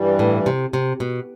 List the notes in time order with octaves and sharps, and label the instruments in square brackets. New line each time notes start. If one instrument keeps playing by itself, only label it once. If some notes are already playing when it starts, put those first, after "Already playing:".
Already playing: [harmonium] G2 E3 G3
[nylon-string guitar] A2
C3
C3
B2